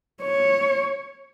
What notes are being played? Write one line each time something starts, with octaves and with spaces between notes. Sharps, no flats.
C#5